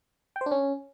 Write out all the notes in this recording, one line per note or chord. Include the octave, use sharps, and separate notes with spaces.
G5
C5
D4
C#4